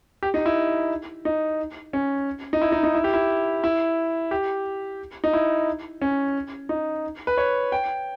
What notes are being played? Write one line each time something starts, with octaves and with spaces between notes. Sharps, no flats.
G4
D#4
E4
D#4
C#4
D#4
E4
D#4
D#4
E4
G4
E4
E4
G4
D#4
E4
C#4
D#4
B4
C#5
G5